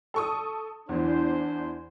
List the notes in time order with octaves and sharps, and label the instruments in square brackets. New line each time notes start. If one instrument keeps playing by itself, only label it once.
[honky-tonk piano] A4 C#6 D#6
[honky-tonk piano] E2 E3 [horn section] D4 C5